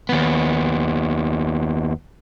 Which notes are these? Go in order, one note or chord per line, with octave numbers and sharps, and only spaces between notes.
D#2 B3